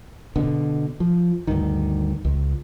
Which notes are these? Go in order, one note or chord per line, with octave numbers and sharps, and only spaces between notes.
B2 D3
F3
D2 G2 D#3
C#2